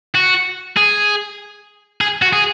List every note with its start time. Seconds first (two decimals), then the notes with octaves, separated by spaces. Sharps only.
0.15 F#4
0.77 G#4
2.01 G#4
2.22 F#4
2.33 G#4